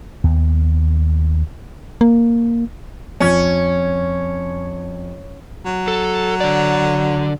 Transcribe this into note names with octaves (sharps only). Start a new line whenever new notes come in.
D#2 B3
A#3
F2 C#4 G#6
F#3
A4
D3 D5